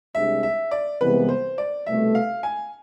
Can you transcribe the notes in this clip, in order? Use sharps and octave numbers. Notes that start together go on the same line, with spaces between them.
C2 C3 G#3 D4 E5
E5
D5
C2 C3 E3 G#3 B3 B4
C5
D5
C2 B2 A3 E5
F5
G#5